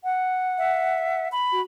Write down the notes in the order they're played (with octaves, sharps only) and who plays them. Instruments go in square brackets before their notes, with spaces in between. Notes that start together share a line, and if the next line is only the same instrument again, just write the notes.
[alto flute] F#5
[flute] E5
B5
[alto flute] F#4